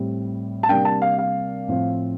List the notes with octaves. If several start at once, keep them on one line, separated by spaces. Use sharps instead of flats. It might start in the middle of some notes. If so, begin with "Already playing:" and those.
Already playing: A2 G3 C4
A5
C3 G3 A#3 D4 G5
A5
F5
F5
A2 F3 C4